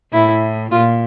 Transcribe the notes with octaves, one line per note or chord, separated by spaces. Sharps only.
A2 E4
A#2 F4